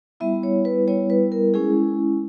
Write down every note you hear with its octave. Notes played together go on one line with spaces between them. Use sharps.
G3 B3 E4 E5
C#5
B4
G3 B3 E4 C#5
B4
A#4
G#3 C#4 E4 G#4